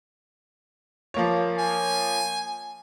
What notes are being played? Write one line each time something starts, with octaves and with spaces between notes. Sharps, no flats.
F3 A#3 C#5
G#5